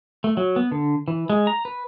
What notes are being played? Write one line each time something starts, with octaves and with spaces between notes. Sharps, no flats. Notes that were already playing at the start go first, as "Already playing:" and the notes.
A3
F#3
B3
D3
E3
G#3
A#5
B4